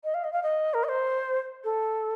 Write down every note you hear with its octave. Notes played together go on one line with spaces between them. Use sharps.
D#5
F5
D#5
F5
D#5
A#4
D#5
C5
A4